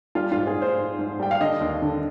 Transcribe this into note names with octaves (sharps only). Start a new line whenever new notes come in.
G3 F4
G#2 F4
G#4
G#2 C5
G#2
G#2
G3 G5
F5
D3 D#5
D#2
D3